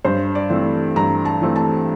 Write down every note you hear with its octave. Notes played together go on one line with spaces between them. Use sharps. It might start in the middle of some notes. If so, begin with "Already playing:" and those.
G2 C5
D5
E3 A3 C4
G2 A#5
A5
E3 A3 C4
A5